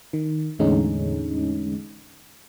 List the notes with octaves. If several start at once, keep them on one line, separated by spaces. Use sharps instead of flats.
D#3
E2 A2 D3 G#3 C#4 D#4